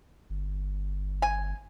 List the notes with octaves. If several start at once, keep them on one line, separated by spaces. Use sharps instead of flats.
G1
G#5